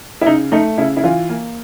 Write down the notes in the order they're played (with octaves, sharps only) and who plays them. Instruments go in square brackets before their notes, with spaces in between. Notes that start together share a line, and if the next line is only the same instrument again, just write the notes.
[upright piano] E4
C#3 D#4
A3 D#4
C#3 E4
E4
E3 F4
A#3